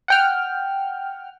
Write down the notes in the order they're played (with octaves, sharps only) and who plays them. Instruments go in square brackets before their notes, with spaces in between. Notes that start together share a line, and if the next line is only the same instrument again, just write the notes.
[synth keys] F#5 G5 F6